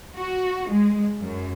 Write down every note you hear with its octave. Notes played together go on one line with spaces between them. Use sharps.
F#4
G#3
F#2